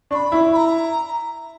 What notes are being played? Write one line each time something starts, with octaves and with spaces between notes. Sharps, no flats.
D4 C#6
B5
E4
B5
A#5